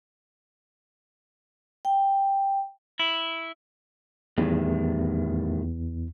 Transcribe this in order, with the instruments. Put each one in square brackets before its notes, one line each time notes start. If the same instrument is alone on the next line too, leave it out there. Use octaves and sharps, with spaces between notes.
[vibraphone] G5
[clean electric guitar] E4
[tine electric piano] E2 [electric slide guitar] A2 D#3 G3